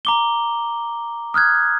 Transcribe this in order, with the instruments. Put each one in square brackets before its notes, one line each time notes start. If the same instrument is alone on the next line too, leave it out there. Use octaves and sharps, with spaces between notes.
[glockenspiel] A#5 D6 G7
D#6 F6 F#6 G#6